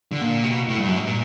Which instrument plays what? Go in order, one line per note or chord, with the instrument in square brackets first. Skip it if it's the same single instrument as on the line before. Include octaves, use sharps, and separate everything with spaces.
[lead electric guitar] D3
A#2
C3
B2
A2
G2
F#2
G#2
A#2